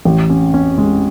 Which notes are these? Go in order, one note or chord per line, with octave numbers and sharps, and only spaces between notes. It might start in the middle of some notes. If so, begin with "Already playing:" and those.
A1
C#4
C#4
G#3